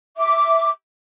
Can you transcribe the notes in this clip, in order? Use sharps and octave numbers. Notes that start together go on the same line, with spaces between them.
E5 D6